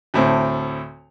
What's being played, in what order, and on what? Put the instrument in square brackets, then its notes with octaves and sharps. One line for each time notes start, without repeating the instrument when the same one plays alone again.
[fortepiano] D2 A2 C4